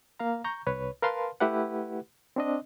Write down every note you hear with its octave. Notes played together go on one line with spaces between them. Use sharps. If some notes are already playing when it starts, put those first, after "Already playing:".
A#3 F5 A#5
A#5 C#6 G6
C2 B4 C#5
A#4 B4 F5 A5 C6
A3 E4 G4 B4 F#5
C4 D4 D#5